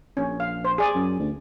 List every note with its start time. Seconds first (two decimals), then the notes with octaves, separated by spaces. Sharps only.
0.17 A#1 C#4
0.40 F5
0.64 C5
0.78 G#4 D5 G#5
0.95 F#2
1.19 D2